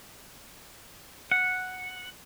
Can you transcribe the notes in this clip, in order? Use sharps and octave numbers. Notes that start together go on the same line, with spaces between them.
F#5